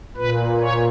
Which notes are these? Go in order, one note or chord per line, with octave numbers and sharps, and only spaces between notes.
A#2 B4
C#5